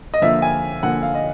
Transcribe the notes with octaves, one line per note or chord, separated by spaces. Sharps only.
D#5
D3 F3 A#3 E5
G#5
D3 F3 A#3 F#5
F5
D#5